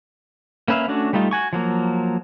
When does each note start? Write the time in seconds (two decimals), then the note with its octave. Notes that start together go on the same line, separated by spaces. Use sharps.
0.68 A#3 C#4 B4 E5 F5
0.88 A3 C#4 D4 F#4
1.13 G3 A3 D#4 F4
1.31 F#4 G#5 C#6
1.53 F3 F#3 A#3